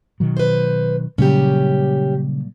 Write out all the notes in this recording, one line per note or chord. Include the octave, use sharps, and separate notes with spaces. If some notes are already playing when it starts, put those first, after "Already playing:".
B2 D#3 F#3
B4 C5
A#2 C#3 F#3 G3 C#4 G4